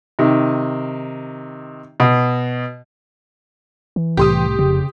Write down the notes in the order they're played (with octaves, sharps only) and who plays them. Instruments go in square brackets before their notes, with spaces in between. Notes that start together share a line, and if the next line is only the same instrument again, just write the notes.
[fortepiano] C3 D#3
B2
[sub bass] E3
[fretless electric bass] C2 A2 [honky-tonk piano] G4 C6 D#6
[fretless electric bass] F1 [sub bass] C#3